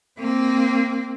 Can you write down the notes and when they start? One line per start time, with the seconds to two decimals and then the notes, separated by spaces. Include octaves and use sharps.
0.19 A#3 C4